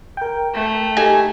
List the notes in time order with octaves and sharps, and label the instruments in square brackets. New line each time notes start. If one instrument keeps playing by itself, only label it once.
[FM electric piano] A#4 G5
[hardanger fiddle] A3
[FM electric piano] D#4 G4 A4 [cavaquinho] G#5